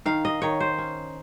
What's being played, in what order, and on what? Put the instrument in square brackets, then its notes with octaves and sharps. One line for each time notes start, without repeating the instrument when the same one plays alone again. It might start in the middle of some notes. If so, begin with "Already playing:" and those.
[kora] D#3 F5
D#5
D#3 C#5
C5
C#4